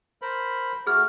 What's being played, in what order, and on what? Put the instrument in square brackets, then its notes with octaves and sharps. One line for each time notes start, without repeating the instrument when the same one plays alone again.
[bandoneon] A#4 C5 B5
[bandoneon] A3 F#4 [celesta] G#4 F6